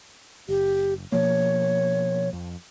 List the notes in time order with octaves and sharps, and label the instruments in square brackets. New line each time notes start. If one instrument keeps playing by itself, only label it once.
[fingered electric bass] F#1 [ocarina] G4
[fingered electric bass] B2 F3 A#3 [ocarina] C#5
[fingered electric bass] F2